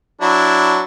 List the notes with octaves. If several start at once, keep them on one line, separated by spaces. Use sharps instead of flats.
F#3 D4 E4